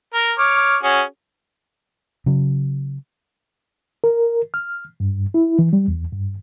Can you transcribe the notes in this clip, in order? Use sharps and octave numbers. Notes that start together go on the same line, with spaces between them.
A#4
C#5 D6 F6
C#4 F#4 G#4
C#3 F#3
A#4
F6
G2
E4
E3
G3
E2
G2